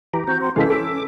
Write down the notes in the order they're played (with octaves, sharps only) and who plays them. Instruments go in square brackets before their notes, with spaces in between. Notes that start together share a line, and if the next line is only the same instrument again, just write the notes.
[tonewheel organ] E3 G4 [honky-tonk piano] A#5
[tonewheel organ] C4 F#4 [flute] G6
[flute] C6
[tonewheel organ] C#3 G#3 F5 [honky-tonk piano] E3 A4 B6 [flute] C#4
[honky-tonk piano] A4 E6 [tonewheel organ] D6